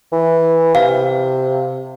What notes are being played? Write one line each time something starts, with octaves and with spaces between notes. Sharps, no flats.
E3
C3 F5